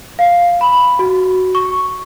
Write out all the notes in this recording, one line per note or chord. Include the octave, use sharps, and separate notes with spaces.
F5
B5
F#4
C#6